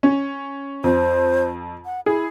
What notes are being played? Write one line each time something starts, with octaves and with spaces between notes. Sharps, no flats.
C#4
F2 C5
F#5
E4 G#4